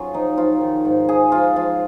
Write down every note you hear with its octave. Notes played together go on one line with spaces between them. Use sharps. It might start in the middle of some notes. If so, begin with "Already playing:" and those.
Already playing: F#3 C#4 F4 G#4
F3 D#4
F3 F4
D#3
G#2
F3 G#4
F3 F4
F3 F4